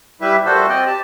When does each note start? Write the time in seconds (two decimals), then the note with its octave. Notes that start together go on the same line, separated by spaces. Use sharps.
0.21 G3 E4 G4 B4 E5
0.45 A#2 G3 A3 F#4 A4 C5
0.69 C4 D5 D#5
0.86 G4 A5